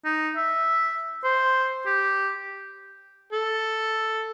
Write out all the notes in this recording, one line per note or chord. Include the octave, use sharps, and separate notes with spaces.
D#4
E5
C5
G4
A4